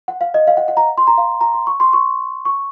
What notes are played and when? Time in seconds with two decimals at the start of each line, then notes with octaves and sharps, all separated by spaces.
0.08 F#5
0.21 F5
0.34 D#5
0.47 F5
0.57 F#5
0.68 F#5
0.77 A#5
0.98 C6
1.07 A#5
1.18 F5
1.41 A#5
1.54 C6
1.67 C#6
1.80 C6
1.93 C#6
2.45 C#6